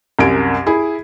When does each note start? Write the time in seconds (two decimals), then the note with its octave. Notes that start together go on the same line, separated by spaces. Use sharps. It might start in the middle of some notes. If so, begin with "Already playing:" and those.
0.19 C2 F#2 G#6 D7
0.66 E4 G#4